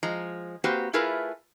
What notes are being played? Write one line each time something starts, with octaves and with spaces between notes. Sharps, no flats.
F3 G#3 A#5
A#3 C4 F#4 G4 B4 C5
A3 E4 F4 G#4 A#4 B4